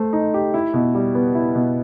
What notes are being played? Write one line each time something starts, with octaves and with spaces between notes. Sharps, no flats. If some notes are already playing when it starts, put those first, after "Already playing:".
Already playing: A3 C5
D#4
G4
E4
B2
G3
B3
E4
B2